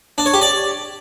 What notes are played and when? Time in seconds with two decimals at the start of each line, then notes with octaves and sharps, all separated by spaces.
0.18 D4
0.26 C#5
0.34 G4
0.41 D5